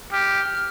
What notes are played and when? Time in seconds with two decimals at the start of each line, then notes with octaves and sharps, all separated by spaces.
0.12 G4 F6